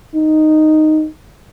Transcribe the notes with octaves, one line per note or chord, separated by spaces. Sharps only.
D#4